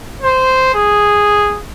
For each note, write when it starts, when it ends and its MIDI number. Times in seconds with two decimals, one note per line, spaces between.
0.22 0.73 72
0.75 1.58 68